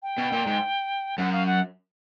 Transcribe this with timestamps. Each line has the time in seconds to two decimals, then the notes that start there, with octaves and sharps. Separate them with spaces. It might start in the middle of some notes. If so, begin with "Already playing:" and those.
0.03 G5
0.18 B2
0.32 A#2
0.46 G#2
1.18 F#2 F#5
1.33 F5
1.46 F#5